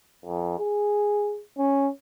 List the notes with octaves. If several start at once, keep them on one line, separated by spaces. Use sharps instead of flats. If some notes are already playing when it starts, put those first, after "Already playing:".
F2
G#4
C#4